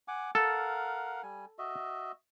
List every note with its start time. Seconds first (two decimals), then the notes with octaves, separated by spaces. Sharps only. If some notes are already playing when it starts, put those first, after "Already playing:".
0.08 F#5 G#5 D6
0.35 A4 A#4 F5 F#5
1.23 G3 G#5
1.58 F#4 D#5 E5